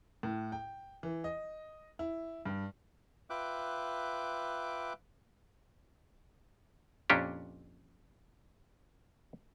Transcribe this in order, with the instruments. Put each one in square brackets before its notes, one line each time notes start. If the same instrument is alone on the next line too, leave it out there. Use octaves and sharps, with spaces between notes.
[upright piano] A2
G5
E3
D#5
E4
G2
[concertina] F4 B4 E5 G5 D6 F#6
[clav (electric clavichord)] F2 A#2 C#4 D4 G4